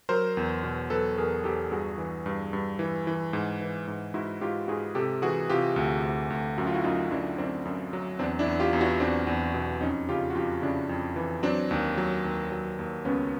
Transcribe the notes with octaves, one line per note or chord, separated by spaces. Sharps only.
F#3 A#4 C5
E2
B2
F#3 A4 B4
E2 G#4 A#4
E2 G4 A4
G2 F#4 G#4
E3
G2
G2
E3
E3
G#2
E3
G#2
G#2 E4 F#4
G#2 F4 G4
G#2 F#4 G#4
C3 G4 A4
E3 F#4 G#4
C3 F4 G4
D2
D2
D2
F#2 F#4
F4
E4 F#4
F#2 D#4 F4
F#2 D4 E4
F#2 C4 D4
F#2
F#3
E2 C4 D4
D4 E4
E2
F4 G4
E2
E4 F#4
E2 C4 D4
E2
B2
F2 C#4 D#4
C#3 F4 G4
F#4
F2 F4 G4
C#3 D4 E4
F2
E3
F#3 C4 D4
D#2
F#3
D#2
F#3
D#2
C#2 B3 C#4